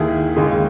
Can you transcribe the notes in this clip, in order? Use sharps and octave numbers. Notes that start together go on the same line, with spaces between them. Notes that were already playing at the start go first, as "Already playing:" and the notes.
Already playing: D#2 D#3 A#3 E4 G#4
D#2 C#3 G#3